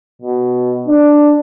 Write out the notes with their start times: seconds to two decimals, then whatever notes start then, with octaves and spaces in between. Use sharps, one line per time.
0.22 B2
0.88 D4